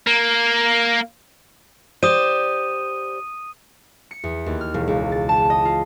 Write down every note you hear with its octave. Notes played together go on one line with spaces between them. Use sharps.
A#3
G4 C5 D5 D#6 D#7
C#7
E2
D#2
F6
E1
C#2
A6
A5
D#5
F4